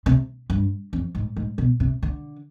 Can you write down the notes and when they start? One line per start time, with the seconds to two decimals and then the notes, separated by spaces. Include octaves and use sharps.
0.06 C3
0.50 G2
0.93 F2
1.15 G#2
1.37 G#2
1.58 B2
1.80 C3
2.02 D3